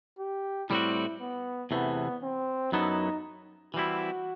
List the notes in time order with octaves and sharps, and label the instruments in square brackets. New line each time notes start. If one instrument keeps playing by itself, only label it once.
[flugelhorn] G4
[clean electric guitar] A2 G3 C4 F#4 [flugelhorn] E4
[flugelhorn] B3
[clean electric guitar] E2 C3 E3 A3 [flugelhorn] B3
[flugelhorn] C4
[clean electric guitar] F#2 F#3 B3 E4 A4 [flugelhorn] D#4
[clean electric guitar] E3 G3 C4 E4 [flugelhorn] F#4